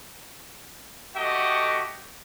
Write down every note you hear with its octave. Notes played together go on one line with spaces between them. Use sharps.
A3 F#4 G4 D#5 F#5 G5